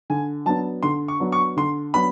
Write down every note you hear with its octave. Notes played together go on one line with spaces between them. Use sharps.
D3 G#5
F#3 B3 D4 A5
D3 C6
C#6
F#3 B3 D4
C#6
D3 C6
F#3 B3 D4 B5